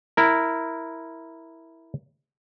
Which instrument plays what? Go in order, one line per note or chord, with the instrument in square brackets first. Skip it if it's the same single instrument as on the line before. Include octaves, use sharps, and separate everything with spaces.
[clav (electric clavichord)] E4 A#4